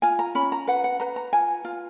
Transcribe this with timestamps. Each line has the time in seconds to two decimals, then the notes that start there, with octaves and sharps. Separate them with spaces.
0.02 F4 G#5
0.19 A#5
0.35 C#4 B5
0.52 A#5
0.67 B4 F#5
0.84 F#5
1.00 B4 A#5
1.16 A#5
1.33 F4 G#5
1.65 F4